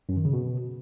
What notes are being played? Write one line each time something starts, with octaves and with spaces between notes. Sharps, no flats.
F#2
D#3
C#3
B2